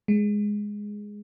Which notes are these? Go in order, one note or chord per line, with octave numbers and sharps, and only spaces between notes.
G#3